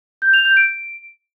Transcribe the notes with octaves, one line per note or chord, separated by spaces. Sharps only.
G6
F7
G6
D7